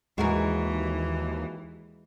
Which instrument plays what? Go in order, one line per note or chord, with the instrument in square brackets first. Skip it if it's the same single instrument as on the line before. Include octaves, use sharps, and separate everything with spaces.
[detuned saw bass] D#2 [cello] E3 [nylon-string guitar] G#3 [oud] F#4 G#4 A#4